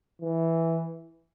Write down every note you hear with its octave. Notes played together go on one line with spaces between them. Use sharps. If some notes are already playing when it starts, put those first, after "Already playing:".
E3